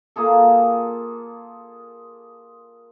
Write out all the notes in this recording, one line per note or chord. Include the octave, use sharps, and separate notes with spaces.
A#3 F4 G#4 A4